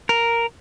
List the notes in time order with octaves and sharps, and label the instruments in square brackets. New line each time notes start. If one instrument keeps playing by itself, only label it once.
[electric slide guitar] A#4